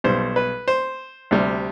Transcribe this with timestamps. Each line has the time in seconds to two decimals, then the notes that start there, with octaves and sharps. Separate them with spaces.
0.04 B1 B2 G3 C5
0.36 B4
0.68 C5
1.31 D2 C3 G3